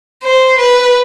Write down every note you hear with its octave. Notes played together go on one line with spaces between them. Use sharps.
C5
B4